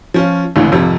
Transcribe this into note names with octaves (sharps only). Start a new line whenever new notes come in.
F3 C#4 F4
G#1 C#2 A2 D3 E3
G#1 F2 C3 F3